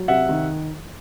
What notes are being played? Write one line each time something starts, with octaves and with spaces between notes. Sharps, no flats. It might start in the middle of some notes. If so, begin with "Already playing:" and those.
Already playing: F#3
C3 E5 F#5
D#3